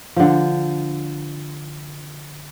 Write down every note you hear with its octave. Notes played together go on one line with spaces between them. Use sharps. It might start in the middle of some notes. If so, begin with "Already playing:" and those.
D3 F3